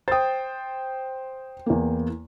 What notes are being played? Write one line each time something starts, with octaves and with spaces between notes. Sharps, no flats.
C5 G5 D#6 A6
E2 A#3